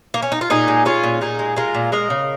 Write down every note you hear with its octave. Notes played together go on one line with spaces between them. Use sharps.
A#3
C#4
D#4
F4
A#2 D#4 G#4
G#3
G#3 C#4 F4
A#2
A#2 D#4 G#4
G#3
G#3 F4 A#4
A#2
G#3 A#4 D#5
C#3